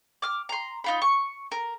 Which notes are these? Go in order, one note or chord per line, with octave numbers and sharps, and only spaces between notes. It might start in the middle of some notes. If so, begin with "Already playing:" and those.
D6 F6
A#5 C6
D#4 F4 B5
C#6
A#4